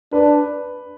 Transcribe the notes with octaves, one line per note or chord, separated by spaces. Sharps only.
D4 B4